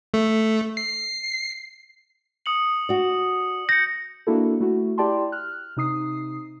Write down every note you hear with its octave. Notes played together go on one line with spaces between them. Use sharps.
A3
C7
D#6 C#7 F#7
F#4 D5
G6 A#6 C#7
A#3 D4 E4 F#4 A4
A3 E4 F#4
E4 G4 D5 G5 A5 C6
F6 F#6
C3 D#4 D#6 C7